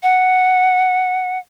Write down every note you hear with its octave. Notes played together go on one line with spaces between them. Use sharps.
F#5